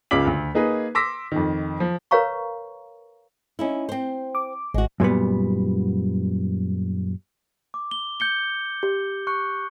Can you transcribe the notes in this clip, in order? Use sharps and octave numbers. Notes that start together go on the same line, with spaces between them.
C#2 C#3 F4 D6 B6 F#7
D2
A#3 D#4 G#4 B4
C6 D6 E6 A#6 B6
F2 D#3
F3
A#4 B4 C#5 F5 A#5 C#6
C#4 D#4 E4
C4 C5
D6
G#1 G#3 F#4
F#2 A#2 G3 B3
D6
G7
G6 C#7 G7
G4
C#6 F#6 C#7